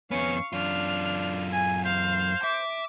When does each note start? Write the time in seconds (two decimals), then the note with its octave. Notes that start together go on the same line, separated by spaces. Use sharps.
0.11 F2 B3 C#4 F5 C#6
0.53 F#2 D4 F4 F6
1.52 G#5
1.85 C5 F5
2.44 E5 D6